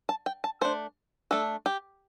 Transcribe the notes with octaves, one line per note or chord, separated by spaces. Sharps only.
A5
G5
A5
A3 D4 C5
A3 D4 A4
G4